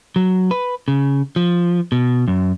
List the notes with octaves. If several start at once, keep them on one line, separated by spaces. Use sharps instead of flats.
F#3
B4
C#3
F3
B2
F#2